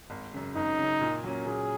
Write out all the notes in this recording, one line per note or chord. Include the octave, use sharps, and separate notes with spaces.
G#1
F#2 C#3
G#1 D#4
F#2 C#3
A#2
F#3 A#3 C#4
A#2 G#4